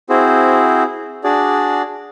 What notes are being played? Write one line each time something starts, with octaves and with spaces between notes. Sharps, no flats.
C4 E4 F#4 G#4 C5
D4 F#4 G#4 D5